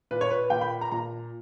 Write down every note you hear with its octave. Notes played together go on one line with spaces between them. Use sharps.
A#2 B4
C#5
B4
A#2 G5
B5
A#5
A#2 A#5